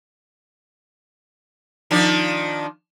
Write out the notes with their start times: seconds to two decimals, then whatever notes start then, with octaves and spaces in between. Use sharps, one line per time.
1.91 D#3 F3 D4